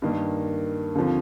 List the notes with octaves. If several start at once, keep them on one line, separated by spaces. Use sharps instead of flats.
G2 D#3 A#3
D#2 D3 F3 C4